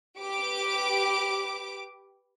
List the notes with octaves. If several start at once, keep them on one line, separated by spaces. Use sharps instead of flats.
G4 B4 D6 D7